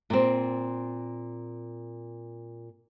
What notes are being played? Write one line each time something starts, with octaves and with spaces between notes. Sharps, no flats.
A#2 C4